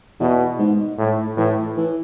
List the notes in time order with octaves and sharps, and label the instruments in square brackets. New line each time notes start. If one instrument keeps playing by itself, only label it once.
[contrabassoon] E2 [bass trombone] B2
[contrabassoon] G#2
[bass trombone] A2
[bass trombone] A2 [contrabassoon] E3
[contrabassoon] E3